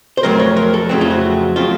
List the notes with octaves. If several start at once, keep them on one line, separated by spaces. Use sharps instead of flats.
C5
F2 C#3 F#3 A3 C4 A#4
C#5
A#4
A4
F2 C#3 F#3 A3 C4 F#4
F4
F#4
C#3 F#3 A3 C4 F4